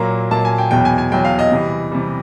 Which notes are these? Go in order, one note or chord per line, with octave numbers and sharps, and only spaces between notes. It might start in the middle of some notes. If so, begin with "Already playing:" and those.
Already playing: A#2 F#3 A#3 A#5
A#2 F#3 A#3 A5
G#5
G5
E2 B2 F#3 G5
G#5
G#5
E2 B2 F#3 G5
F5
D#5
C3 E3 G3
C3 E3 G3